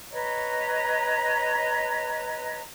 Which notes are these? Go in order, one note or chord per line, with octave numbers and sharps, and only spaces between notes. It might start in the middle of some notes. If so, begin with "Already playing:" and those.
B4 C#5 D#5 A#5